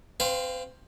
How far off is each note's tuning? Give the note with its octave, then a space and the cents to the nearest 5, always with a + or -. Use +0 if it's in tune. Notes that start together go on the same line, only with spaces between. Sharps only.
C4 +10 C5 -45 F5 +0